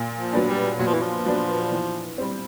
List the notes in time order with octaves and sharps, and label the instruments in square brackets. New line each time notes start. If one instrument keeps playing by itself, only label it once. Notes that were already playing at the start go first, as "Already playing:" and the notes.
Already playing: [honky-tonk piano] A#2
[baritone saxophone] F3
[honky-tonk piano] F#3 B3 D4
[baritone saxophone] G3
[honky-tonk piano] A#2 [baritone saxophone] F#3
[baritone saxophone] F3
E3
F3
[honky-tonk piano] F#3 B3 D4
E3
G3 C4